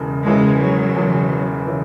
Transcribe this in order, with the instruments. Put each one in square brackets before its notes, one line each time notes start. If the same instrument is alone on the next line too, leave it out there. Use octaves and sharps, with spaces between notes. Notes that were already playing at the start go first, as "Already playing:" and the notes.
Already playing: [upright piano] E1 E2 C#3 E3
[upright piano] E1 E2 C#3 E3 [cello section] G#3
[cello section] F#3
[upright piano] E1 E2 C#3 E3
C#3 E3